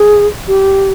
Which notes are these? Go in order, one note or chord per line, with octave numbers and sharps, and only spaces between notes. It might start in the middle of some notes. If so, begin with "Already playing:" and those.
Already playing: G#4
G4